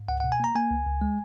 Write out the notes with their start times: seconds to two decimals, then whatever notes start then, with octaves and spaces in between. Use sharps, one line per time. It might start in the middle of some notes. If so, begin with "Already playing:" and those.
Already playing: G#2
0.08 C#2 F#5
0.20 B2 F#5
0.32 G#5
0.40 A#3 A#5
0.55 A#3 G#5
0.71 C#2
0.86 C#2
1.01 G#3